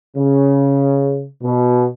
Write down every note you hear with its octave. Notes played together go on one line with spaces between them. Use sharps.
C#3
B2